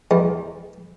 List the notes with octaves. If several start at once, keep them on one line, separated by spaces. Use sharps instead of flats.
E2